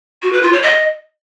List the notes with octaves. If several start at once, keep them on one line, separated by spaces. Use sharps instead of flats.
F#4
B4
F4
C#5
D#5